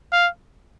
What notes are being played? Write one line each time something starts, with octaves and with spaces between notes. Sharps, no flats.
F5